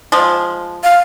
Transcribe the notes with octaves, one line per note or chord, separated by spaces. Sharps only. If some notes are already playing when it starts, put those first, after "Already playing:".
F3 G#3
F5